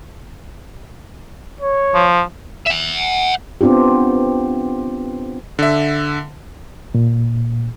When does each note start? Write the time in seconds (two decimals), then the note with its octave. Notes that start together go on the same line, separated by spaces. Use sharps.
1.61 C#5
1.95 F3
2.66 E5 F#5
3.61 B3 C4 D4 F4 G4
5.59 D3 E5
6.94 A#2